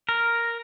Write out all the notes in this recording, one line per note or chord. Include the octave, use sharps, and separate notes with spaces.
A#4